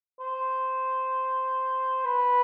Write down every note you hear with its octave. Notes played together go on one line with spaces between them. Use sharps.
C5
B4